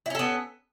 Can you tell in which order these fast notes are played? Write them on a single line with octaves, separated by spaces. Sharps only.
E4 C#4 A4 B3